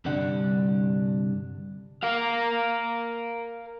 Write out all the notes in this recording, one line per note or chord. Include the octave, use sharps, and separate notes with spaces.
C2 G2 D3 G3 D4 F#5
A#4 F5